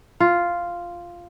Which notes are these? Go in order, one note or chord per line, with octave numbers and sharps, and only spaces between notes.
F4